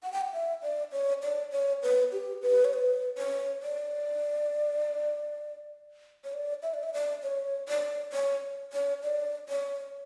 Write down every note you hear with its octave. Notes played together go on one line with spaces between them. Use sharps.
F#5
G5
F#5
E5
D5
C#5
D5
C#5
B4
G4
B4
C#5
B4
C#5
D5
C#5
D5
E5
D5
E5
D5
C#5
D5
C#5
C#5
D5
C#5